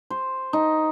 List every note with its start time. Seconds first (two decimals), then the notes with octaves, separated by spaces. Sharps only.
0.10 C5
0.53 D#4